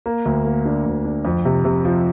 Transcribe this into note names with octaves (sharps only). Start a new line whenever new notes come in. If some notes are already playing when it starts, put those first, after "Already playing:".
A#3
D2
A#3
D4
D2
D4
F2
C3
C3
F3